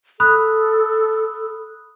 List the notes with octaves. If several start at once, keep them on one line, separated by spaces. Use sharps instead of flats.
A4 B5 D#6 F#6